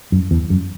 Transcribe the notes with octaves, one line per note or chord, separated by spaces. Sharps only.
F#2
E2
F#2